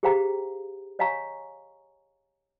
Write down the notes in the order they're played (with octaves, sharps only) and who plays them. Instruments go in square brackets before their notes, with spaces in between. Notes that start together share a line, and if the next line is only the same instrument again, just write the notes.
[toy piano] G4 G#4 C5 F5 G5 A#5
C#5 D#5 F5 G#5 A#5 C#6